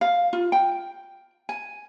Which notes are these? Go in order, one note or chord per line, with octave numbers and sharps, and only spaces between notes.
F5
F4
G5
G#5